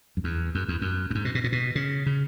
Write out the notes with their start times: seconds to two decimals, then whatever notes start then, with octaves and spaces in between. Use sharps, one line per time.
0.17 F#2
0.24 E2
0.55 F#2
0.68 E2
0.81 F#2
1.10 F#2
1.15 G#2
1.25 B2
1.35 B2
1.44 A#2
1.52 B2
1.75 C#3
2.06 C#3